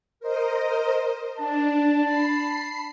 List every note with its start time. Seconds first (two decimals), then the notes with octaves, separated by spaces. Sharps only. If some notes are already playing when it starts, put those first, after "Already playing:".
0.20 A#4 C5 D#5
1.37 D4 A5
2.03 B5 C7